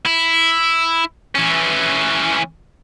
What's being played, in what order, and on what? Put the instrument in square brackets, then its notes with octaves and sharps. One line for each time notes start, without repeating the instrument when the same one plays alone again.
[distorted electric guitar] E4
E3 C#4